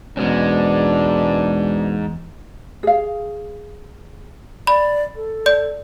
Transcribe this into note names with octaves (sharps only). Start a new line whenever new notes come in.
E2 G#2 B2 G#3 C#4 D4
G#4 F5
D5 B5
A4
D5 G6